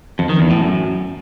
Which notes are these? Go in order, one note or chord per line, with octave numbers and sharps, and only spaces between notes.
F2
D#3
E2
A2
F#2